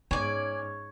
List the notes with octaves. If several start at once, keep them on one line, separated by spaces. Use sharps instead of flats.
G#2 B3 C#4 D#4 C#5 D5 G#5